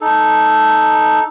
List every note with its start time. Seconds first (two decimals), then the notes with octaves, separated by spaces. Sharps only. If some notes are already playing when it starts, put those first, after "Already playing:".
0.01 D#4 A4